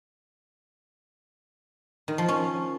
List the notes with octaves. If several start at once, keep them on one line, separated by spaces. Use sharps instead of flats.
D#3
F3
C#4